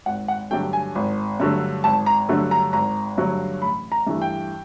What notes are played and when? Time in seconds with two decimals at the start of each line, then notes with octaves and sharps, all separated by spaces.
0.06 G#1 F#5
0.28 F#5
0.51 G2 D3 F#3 A3 G5
0.73 G#5
0.95 G#1
1.40 G2 D3 F#3 A3
1.84 G#1 A5
2.06 A#5
2.29 G2 D3 F#3 A3
2.51 A#5
2.73 G#1 A#5
3.18 G2 D3 F#3 A3
3.62 A1 B5
3.92 A#5
4.07 G2 E3 A3
4.22 G5